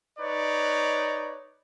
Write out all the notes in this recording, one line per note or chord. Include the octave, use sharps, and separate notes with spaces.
D#4 B4 C#5 D5